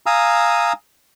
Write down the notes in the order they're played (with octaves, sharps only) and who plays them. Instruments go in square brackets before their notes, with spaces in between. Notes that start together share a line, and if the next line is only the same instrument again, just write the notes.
[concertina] F5 G#5 A#5 D#6 E6